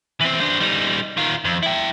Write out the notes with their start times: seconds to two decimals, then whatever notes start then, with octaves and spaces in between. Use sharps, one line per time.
0.21 E3 C4
0.40 D4 C5
0.60 G3 D#4
1.17 D#3 F4
1.45 F2
1.63 E4 G5